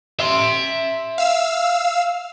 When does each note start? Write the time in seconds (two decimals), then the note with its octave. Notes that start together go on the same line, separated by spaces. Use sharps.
0.20 E5 C6
1.18 F5 E6